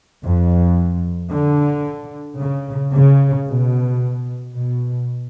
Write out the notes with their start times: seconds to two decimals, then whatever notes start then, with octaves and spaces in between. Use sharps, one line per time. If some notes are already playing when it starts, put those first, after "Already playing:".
0.24 F2
1.33 D3
2.40 C#3
2.95 C#3
3.48 B2
4.55 B2